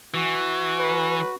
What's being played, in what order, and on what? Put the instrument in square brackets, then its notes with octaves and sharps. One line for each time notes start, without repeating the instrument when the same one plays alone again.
[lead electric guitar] E3 [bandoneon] F#4
[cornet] B4